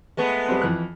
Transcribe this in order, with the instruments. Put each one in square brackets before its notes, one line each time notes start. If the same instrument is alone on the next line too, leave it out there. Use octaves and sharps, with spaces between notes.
[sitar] G#3 A3 B3
[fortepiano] G3 C4
F2 E3 F#6